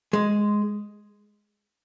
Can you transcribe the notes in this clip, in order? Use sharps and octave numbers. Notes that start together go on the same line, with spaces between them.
G#3